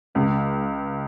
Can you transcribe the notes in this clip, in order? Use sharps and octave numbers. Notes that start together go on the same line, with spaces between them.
C#2 G#3